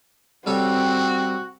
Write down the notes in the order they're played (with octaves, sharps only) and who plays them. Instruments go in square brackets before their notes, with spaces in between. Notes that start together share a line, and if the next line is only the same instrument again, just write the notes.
[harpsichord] G3 A4 C#5 [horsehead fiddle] C4 [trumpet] F#4